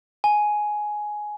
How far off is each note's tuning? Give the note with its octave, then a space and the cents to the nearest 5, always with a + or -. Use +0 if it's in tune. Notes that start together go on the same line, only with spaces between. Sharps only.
G#5 +10